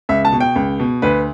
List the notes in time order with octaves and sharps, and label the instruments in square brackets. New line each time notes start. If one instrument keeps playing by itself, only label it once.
[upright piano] C#2 E5
A5
B2
G5
C#2
B2
D2 B4